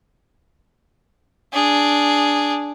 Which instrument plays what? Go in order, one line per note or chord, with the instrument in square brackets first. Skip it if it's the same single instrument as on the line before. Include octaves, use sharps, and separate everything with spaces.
[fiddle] D4 G#4